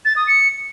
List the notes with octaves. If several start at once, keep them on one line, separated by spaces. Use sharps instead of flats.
A6
D#6
C#7